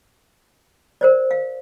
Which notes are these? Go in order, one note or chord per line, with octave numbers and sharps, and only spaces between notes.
A#4 C5 D5
F5